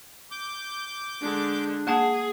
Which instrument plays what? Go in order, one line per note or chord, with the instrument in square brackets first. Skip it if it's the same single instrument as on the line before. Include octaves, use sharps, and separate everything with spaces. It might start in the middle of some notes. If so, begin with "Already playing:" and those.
[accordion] D6 G6
[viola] D3 G#3 [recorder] D4
[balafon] A#3 F#5 A5 [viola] G#4